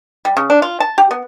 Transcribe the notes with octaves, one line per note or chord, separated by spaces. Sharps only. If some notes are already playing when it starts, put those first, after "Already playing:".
G3
C#3
D4
F4
A5
G4
B3